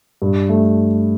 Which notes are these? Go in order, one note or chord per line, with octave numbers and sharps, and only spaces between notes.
G2
A3